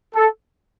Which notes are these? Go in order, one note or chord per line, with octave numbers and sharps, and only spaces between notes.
A4